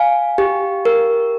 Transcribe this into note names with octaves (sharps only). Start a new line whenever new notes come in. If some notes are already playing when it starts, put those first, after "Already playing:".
Already playing: F5 G#5
G4
A#4